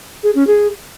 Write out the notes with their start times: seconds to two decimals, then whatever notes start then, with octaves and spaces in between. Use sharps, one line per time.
0.23 G#4
0.35 C#4
0.47 G#4